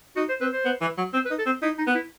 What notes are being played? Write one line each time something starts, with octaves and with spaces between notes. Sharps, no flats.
D#4 F#4
C5
C4 B4
C5
B3
E3
F#3
C4 C5
B4
D#4
A4
C4
D#4 E4
D#4
B3
E4